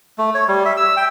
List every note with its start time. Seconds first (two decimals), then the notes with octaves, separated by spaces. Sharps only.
0.18 A3
0.35 C#5
0.48 G3
0.65 E5
0.77 E6
0.97 G5